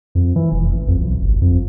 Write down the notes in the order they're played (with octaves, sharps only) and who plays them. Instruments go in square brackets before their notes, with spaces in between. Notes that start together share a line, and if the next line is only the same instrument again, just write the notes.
[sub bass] F2
E3
E1
A1
F2
B1
G1
F2